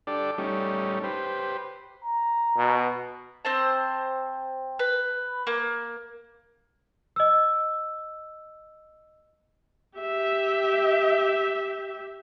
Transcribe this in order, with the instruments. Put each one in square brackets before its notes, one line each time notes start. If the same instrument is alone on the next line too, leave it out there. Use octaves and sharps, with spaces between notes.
[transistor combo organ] D4 G4 A4 D5
G3 A3 C#4 D#4
G4 B4 C5
[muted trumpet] A#5
[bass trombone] B2
[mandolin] C4 C5 A5
B4
A#3
[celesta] D#5 E6
[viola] G4 E5